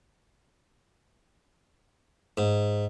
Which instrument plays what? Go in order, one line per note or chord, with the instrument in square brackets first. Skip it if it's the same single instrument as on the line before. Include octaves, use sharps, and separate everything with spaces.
[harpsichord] G#2